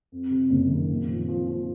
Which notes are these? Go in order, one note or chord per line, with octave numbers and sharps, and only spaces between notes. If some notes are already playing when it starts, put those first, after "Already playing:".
F2
C3
F#1
D#3
A#2
F3
F3
F3